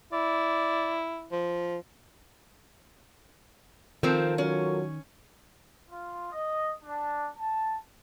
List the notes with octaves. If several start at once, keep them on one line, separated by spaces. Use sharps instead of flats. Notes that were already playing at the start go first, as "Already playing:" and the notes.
E4 D5
F3
D#3 F3 C4 F4 A4 A#4
F#3 C#4
F4
D#5
D4
A5